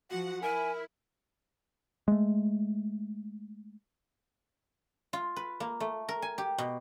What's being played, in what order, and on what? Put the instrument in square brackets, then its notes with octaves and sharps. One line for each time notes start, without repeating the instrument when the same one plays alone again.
[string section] F3 F#5 [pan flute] F#4
[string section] E4 [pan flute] A#4 [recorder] G#5
[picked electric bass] G#3 A3
[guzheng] F4
B4
A#3
A3
A#4
G#5
G4
B2